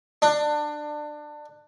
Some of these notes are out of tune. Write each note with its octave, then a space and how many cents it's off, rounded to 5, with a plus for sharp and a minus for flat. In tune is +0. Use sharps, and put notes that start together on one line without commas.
D4 +25